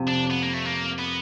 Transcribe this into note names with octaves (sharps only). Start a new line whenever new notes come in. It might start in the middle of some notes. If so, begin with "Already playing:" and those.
Already playing: F2 C3
D4
B3
A#3
A3
A#3
B3